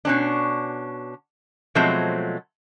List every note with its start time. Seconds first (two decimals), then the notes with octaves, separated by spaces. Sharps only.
0.05 B2 C#4 D4
1.75 B2 F3 F#3 G#3 A3 C4